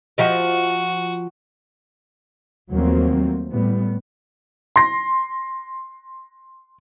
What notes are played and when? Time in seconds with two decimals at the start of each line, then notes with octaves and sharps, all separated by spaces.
0.18 F3 F#4 G4 D#5
2.71 D#2 F3 F#3 A3 A#3 C4
3.51 A2 G3 B3
4.76 C6 A#6